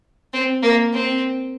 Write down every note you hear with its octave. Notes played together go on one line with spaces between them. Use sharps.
C4
A#3
C4